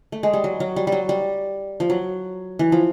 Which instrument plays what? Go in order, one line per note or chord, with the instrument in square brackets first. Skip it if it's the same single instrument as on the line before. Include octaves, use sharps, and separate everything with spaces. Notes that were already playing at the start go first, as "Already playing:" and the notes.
[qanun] A3
G#3
G3
F#3
F#3
G3
G3
F#3
G3
F3
F#3
E3
F3